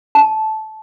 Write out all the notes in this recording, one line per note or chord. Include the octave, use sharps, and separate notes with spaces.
A5